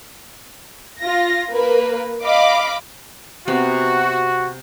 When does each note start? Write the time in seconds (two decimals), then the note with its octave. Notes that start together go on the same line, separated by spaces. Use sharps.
1.01 F4 A#6
1.51 A#3 A#4 B4
2.25 D#5 F5 B5 D6
3.48 C3 B3 F#4 B5